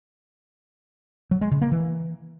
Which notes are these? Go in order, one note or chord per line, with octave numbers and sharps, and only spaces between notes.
F#3
G#3
C#3
A#3
E3